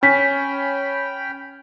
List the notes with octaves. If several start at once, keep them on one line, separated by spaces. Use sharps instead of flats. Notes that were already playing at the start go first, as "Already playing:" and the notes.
C#4 G5 G#5 B5 F6 B6